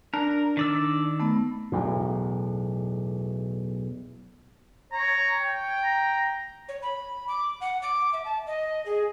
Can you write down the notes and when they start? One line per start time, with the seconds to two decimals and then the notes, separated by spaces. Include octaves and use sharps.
0.14 D4 A#4
0.57 D#3 D5 E6
1.20 A3 B3
1.72 B1 E2 A2
4.92 C#5 A#5
5.35 G5
5.83 A#5
6.69 C#5
6.82 B5
7.28 D6
7.61 F#5
7.82 D6
8.13 E5
8.25 A5
8.47 D#5
8.86 G#4